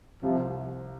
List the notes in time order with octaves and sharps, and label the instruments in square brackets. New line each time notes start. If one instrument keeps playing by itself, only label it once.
[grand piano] C2 [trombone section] C3 F3